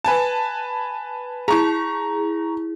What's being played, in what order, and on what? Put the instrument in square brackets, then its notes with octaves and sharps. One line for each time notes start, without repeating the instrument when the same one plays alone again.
[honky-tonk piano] B4 G#5 A5
[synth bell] E4 G#4 [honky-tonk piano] A#5 C#6